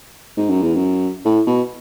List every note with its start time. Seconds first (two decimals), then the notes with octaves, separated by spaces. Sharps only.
0.37 G#2
0.49 F#2
0.62 E2
0.75 F#2
1.25 A2
1.47 B2